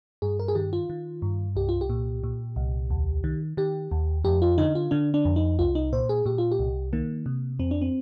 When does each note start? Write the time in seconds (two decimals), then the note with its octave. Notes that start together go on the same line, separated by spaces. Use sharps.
0.22 G2 G#4
0.40 A#4
0.48 G#4
0.55 D#3 G4
0.73 F4
0.90 D#3
1.22 G2
1.56 C2 G4
1.69 F4
1.81 G4
1.89 A#2
2.24 A#2
2.56 C2
2.90 D#2
3.24 D#3
3.57 D#3 G4
3.91 D#2
4.24 F2 G4
4.42 F4
4.58 D3 D#4
4.75 F4
4.91 D3 D4
5.14 D4
5.25 F2
5.36 D#4
5.59 C2 F4
5.75 D#4
5.93 A#2 C5
6.09 G#4
6.26 A#2 G4
6.38 F4
6.52 G4
6.59 C2
6.93 D#3 A#3
7.26 C3
7.59 F2 C4
7.71 D4
7.82 C4